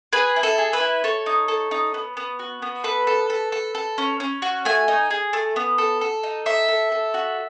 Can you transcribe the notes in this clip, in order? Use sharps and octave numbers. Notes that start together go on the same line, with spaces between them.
G#4 B4
E4
A4
G#4
B4
E4
A4 C#5
D#4
A4
D#4
B3
B3
F#4
B3
A4 B4
A4
A4
A4
A4
C#4
C#4
F#4
A3 G#5
D#4
G#4
A3
B3
A4
A4
D#4
A4 E5
A4
A4
F#4